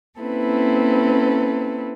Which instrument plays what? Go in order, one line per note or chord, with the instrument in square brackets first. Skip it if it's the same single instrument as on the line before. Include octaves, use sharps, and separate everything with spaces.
[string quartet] A#3 C4 C#4 E4 A4 B4